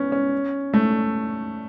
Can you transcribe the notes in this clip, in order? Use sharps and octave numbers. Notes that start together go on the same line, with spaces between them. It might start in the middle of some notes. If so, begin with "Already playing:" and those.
Already playing: B3 C#4
C#4
A3